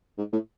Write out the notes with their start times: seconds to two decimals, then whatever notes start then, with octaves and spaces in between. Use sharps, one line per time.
0.18 G#2
0.33 A2